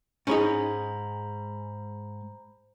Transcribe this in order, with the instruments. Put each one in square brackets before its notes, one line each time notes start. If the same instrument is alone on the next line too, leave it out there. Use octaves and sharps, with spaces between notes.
[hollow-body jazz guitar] G#2 G#4 [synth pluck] C#4 D#4 [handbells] C5 A#5 B5